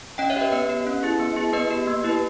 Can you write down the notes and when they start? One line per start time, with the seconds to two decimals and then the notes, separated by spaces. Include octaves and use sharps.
0.18 C#4 D#5 G5
0.30 C#5 E5
0.36 G4 B4 D#5
0.52 B3 B4 D#5
0.69 G4
0.87 C#4
1.03 E4 G#4
1.20 B3
1.37 E4 G#4
1.53 B3 B4 D#5
1.71 G4
1.87 A#3
2.04 E4 G4 B4